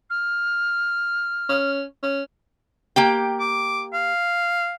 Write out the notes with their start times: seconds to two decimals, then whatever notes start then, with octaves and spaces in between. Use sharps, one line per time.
0.10 F6
1.49 C#4
2.03 C#4
2.96 A#3 G4 G5
3.40 D6
3.93 F5